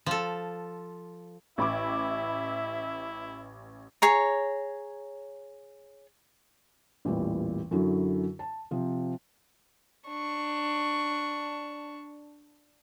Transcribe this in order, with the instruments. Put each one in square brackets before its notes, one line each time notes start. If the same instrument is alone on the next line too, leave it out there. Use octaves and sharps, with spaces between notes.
[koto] F3 A4
[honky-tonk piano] A1 B5 D6 [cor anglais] E4 [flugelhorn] E5
[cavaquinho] G#4 C#5 A#5
[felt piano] A1 E2 A#2 G3
F#2 D3 F#3 E4
A5
C3 F3
[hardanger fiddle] D4 C#6